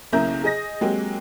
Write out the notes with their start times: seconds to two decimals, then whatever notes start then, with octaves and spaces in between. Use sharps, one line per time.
0.13 B1 C#3 A#3 E4 A#5 G6
0.44 G#4 D#5 A#6
0.81 F#3 G#3 A#3 C4 F#4 G4